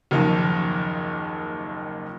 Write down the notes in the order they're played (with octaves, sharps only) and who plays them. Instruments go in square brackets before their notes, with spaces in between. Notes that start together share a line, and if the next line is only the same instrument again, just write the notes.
[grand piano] F#1 D#2 D#3 F3 D#4